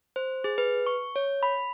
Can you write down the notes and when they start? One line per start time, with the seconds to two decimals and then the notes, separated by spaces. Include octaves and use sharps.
0.16 C5
0.44 G#4
0.58 B4
0.86 C#6
1.16 C#5
1.43 B5